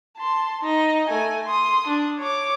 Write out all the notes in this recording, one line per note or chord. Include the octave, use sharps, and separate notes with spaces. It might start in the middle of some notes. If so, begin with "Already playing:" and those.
A5 C6
D#4 D#5
A3 G#5
C6 D#6
D4
C#5 D6